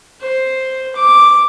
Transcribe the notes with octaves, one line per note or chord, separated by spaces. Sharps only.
C5
D6